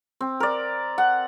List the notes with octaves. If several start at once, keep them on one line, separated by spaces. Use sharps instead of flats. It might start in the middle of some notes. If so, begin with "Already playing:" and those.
C4
A#4 D5
F#5